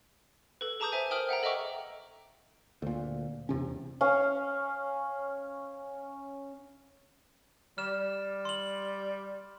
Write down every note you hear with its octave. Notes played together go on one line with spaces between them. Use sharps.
A4 B4
G#4 A5 A#5 D6 D#6 G6
C5 E5 G#5
A#4 C5 G5 D#6 F6 F#7
E5 F#5 G5 A#5
A4 D#5 E5 G5 C#6 D6
D2 A#2
E2 C3 C#4
C#4 F5
G3 F6 E7
C6 F#7